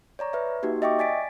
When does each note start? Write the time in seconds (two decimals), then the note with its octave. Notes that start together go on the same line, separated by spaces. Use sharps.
0.19 C#5 D5 A#5 C#6
0.33 B4 E5
0.63 A#3 D#4 F#4 G4
0.82 D#5 E5 G5 C#6 D6
0.99 D5 G#5 A6 B6 D7